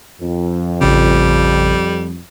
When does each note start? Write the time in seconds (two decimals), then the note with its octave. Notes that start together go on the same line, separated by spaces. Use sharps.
0.21 F2
0.81 A1 C#3 G3